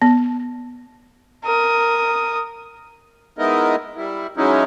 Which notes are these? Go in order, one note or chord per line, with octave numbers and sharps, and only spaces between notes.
B3
A#4 D#6
G#3 B3 D#4 E4 A#4 D#5
G3 E4
F#3 G#3 C#4 D#4 E4